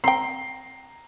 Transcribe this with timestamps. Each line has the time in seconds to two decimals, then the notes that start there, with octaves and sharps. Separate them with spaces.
0.04 C4 G5 A#5 C7